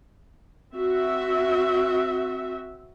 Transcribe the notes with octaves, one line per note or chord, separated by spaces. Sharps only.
C4 F#4 E5